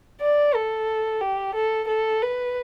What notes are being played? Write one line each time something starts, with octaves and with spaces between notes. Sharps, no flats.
D5
A4
G4
A4
A4
B4